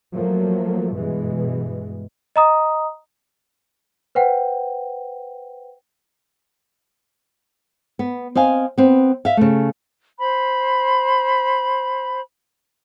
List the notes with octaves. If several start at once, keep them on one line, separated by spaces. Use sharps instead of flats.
F3 F#3 A3 A#3
G2 B2 E3 G#3
D#5 A#5 D#6
B4 C5 F#5 G5
B3
C4 D#5 F5 G#5
B3 C4
E5 F5
C#3 A3
C5 B5